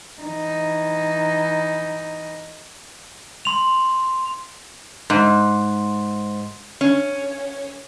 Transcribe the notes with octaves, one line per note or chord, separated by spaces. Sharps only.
E3 D#4
C6 F7
G#2
C#4